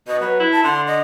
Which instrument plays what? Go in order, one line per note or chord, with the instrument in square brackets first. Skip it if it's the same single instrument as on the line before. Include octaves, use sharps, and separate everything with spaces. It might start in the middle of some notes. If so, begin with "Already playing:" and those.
[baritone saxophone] B2 [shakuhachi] D#5
[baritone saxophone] F#3 [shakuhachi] B4
[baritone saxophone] E4
[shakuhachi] A5
[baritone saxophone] D3 [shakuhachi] C6
[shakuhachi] D#5